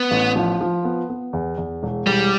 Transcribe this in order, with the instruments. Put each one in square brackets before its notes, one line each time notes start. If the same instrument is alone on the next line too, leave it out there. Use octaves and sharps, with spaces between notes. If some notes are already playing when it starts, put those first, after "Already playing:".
Already playing: [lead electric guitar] B3
[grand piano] A1
F3
F3
B3
B3
E2
E2
E1
[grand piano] E1 [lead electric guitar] G3